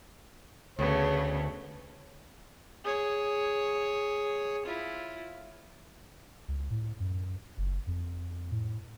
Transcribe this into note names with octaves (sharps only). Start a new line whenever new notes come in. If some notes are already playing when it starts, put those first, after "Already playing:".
D2 C#3 A3 B3 C#5
G#4 C#5
E4 F4
C#2
A2
F#2
F#1
F2
A2